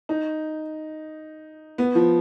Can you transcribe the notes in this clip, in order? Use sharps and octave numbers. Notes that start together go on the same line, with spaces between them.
D#4
B3
F3